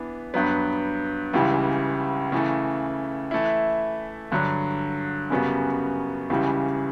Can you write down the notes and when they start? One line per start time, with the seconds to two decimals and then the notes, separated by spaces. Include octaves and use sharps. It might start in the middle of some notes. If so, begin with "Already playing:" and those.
Already playing: E3 B3 D4
0.34 G2 F#3 B3
1.33 C#2 C#3 E3 G3
2.32 C#3 E3 A3
3.31 E3 A3 E4
4.32 G2 D3 F#3
5.30 F#2 C#3 G3 B3 F#4
6.30 C#2 C#3 E3 G3